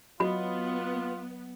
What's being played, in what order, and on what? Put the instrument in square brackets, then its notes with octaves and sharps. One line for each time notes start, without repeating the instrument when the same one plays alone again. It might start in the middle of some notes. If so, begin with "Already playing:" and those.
[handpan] F#3 D#5 [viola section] B3 [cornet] F4 [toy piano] F#4 B5